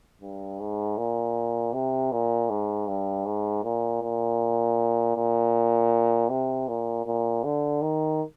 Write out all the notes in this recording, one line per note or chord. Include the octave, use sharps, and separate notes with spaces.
G2
G#2
A#2
C3
A#2
G#2
G2
G#2
A#2
A#2
A#2
C3
A#2
A#2
D3
D#3